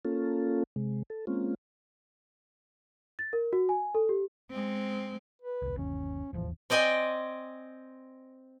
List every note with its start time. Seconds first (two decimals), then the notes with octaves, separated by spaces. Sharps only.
0.05 A#3 C#4 F4 A4
0.76 C3 G#3
1.10 A4
1.27 G#3 A#3 C4 C#4 F4
3.19 A6
3.33 A#4
3.53 F#4
3.69 G#5
3.95 A4
4.09 G4
4.50 G#3 C4
5.41 B4
5.62 E1 C2
5.77 G1 D#2 C#4
6.33 D#1 A1 E2 F3
6.70 C4 D5 D#5 G5 G#5